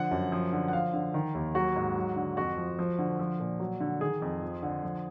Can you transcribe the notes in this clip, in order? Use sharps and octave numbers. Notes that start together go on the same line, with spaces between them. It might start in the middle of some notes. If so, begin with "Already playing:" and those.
Already playing: D3 F3 F#5
F#2
F3
D3
F#5
F3 F5
D3
D#3
D#2
F#3 F#4
G#2
F#3
D3
F2 F#4
F3
F3
D3
F3
A#2
F#3
D3
D#3 G#4
F2
F3
D3
F3